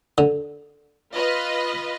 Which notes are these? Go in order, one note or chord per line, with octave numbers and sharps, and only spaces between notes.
D3
F4 B4 D#5